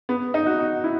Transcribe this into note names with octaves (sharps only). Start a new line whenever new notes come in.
B3
D#4
F#4
F#4
E4